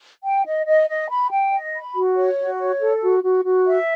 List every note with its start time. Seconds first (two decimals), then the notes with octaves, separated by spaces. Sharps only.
0.23 G5
0.45 D#5
0.66 D#5
0.88 D#5
1.09 B5
1.31 G5
1.51 D#5
1.74 B5
1.94 F#4
2.16 C#5
2.38 F#4
2.59 C#5
2.80 A4
3.02 F#4
3.23 F#4
3.45 F#4
3.66 E5